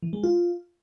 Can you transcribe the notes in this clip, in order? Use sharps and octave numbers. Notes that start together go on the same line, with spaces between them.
E3
G#3
F4